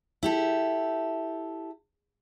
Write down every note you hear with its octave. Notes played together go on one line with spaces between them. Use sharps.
E4 G4 A4